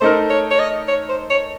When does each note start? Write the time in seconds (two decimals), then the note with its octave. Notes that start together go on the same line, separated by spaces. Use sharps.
0.01 A3 D#4 A#4 C5
0.30 C#5
0.51 C#5
0.59 D#5
0.88 C#5
1.09 C5
1.30 C#5